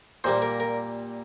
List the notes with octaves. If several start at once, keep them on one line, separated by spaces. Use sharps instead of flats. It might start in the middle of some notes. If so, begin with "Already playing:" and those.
A#2 G3 A#3 C5
A#4
A#4